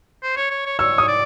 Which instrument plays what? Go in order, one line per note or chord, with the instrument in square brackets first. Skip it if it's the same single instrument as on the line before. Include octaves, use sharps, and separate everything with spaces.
[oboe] C5
C#5
C#5
C#5
[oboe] C#5 [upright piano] E6
[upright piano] D#6
[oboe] D5